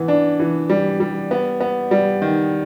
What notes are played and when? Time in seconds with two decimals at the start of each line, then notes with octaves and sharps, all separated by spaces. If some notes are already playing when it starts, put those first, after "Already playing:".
Already playing: E3 B3
0.08 D4
0.40 E3
0.70 G3
1.00 G3
1.31 B3
1.60 B3
1.91 G3
2.22 D#3